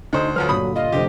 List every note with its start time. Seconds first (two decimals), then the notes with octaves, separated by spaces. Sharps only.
0.13 D2 D3 D#4 C5
0.36 D2 F3 F#3 B4 F6
0.49 G2 A#2 D3 B5 D#6
0.76 F4 D#5
0.92 F1 D3 F3 G4